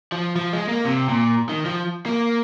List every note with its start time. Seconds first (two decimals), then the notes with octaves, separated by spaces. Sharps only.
0.12 F3
0.36 F3
0.53 G#3
0.68 A#3
0.85 C3
1.09 A#2
1.49 D#3
1.65 F3
2.06 A#3